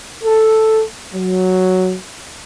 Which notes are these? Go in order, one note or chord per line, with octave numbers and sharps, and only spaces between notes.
A4
F#3